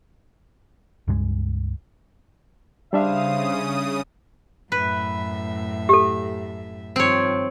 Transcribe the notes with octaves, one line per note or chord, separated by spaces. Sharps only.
C#2 G2 G#3
C#3 G3 D4 E4 C5 E5 F5 D#6
F#2 A2 B4 E5
G4 A4
G2 D#3 F3 C4 C#5